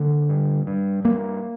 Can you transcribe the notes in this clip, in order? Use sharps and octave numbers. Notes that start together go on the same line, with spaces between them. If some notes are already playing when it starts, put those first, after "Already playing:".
Already playing: D3 A#3
G2
G2
G2 A#3